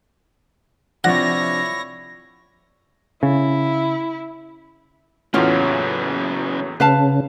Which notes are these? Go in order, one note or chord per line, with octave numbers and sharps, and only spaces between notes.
C3 F3 D4 E4 C#5 F#5 A#6
C#3 E4
E2 A2 C#3 E3 F#3 C#4 F4 F#4
C#3 B4 F5 A5